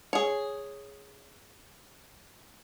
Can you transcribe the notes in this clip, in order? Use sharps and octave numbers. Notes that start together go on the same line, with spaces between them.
G#4 C#5